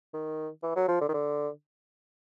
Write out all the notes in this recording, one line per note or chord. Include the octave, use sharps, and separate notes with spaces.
D#3
E3
F#3
F3
D3
D#3
D3